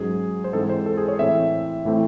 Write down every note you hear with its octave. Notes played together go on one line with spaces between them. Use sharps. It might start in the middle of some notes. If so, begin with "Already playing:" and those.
Already playing: G#2 F#3 C#4 G#4
C5
G#2 E3 G#3 C4 D#4 A4
C5
A4
G#4
C#5
A2 E3 A3 C4 E5
A2 E3 A3 C4 E4